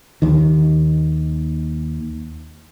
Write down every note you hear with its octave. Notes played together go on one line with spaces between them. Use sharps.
D#2 D#3